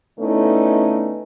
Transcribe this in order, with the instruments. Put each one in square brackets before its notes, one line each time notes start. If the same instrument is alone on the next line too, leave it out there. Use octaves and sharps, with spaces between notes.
[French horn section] D3 A3 B3 C#4 D#4 E4